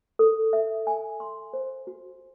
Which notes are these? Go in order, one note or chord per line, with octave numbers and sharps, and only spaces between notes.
A4
E5
G#5
C6
C5
F#4